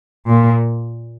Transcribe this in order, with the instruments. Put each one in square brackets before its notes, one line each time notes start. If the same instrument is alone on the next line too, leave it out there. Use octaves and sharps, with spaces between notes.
[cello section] A#2